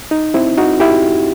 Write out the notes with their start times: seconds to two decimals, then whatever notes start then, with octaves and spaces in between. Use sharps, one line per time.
0.11 D#4
0.34 C4 E4
0.58 D#4 F#4
0.80 E4 G4